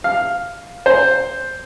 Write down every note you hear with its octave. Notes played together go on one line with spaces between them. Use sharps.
F5
C5